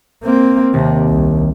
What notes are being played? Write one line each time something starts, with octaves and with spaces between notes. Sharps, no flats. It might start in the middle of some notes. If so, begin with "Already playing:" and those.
A#3 C4
D#2 C3
C2